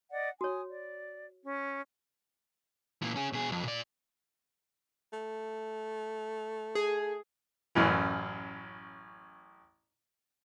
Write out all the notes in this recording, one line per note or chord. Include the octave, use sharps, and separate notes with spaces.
D5 D#5 F#5
F#4 C#5 G#5 D#6
D5
C#4
A#2 E3
C#4 G#4
B2 G#4
B1 F2
A#2 D5
A3
G#4
A1 F#2 E3